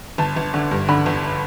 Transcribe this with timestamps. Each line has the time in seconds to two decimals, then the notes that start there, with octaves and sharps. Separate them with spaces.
0.18 G1 A5
0.36 G1
0.54 D3
0.71 G2
0.89 D3 B5
1.06 G1